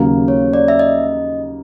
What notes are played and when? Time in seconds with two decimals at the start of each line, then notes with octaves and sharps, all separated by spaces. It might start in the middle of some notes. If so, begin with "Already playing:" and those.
Already playing: D#2 C#3 F#3 A#3
0.28 C#5
0.53 D5
0.68 E5
0.79 D#5